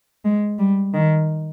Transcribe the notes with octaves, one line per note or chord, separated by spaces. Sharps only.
G#3
G3
D#3